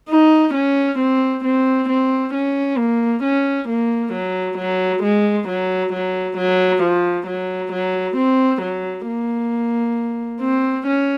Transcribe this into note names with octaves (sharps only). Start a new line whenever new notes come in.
D#4
C#4
C4
C4
C4
C#4
A#3
C#4
A#3
F#3
F#3
G#3
F#3
F#3
F#3
F3
F#3
F#3
C4
F#3
A#3
C4
C#4